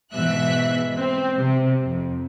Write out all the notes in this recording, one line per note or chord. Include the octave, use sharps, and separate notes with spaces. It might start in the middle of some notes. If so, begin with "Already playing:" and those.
G#2 B2 E3 E5 F#6
C4
C3
F2